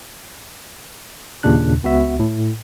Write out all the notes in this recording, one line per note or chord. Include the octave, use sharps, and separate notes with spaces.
D#2 A#2 C#3 D4 F#6
C#2 B3 F#4 E5
A2